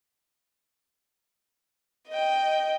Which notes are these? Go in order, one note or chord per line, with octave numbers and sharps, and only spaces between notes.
D#5 G5